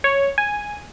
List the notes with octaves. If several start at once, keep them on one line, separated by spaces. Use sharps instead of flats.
C#5
G#5